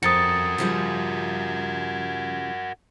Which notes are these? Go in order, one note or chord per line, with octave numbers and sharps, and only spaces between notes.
F2 F#4 A#4 D#6 A6 C#7
C#3 F3 G3